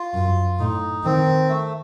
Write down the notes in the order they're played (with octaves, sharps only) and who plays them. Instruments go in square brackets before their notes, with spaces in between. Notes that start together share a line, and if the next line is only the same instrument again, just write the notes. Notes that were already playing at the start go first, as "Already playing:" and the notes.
Already playing: [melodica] F4
[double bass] F#2
[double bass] A2 [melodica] D#4
[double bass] D#3 [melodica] C4
[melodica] A3